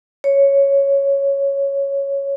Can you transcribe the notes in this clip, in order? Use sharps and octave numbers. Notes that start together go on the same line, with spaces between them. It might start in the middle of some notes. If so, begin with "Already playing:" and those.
C#5